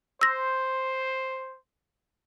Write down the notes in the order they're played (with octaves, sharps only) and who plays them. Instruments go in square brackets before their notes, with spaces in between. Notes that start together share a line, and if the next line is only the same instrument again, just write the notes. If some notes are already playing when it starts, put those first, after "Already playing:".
[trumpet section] C5 [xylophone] E6 A#6